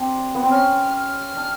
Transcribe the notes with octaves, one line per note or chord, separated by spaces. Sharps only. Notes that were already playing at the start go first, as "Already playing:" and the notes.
Already playing: C4 D4 G4
B3
C4
C#4 F6
F6
D4